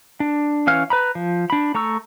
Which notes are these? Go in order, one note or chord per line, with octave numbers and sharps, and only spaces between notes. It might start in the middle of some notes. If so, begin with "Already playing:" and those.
D4
E3 C#4 F5 F6
B4 A#5 B5
F3
D4 B5
A3 A#5 C#6 E6